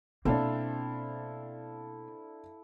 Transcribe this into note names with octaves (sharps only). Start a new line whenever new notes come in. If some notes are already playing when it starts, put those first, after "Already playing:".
B2 A#3 C4 D4 E4 A4 F5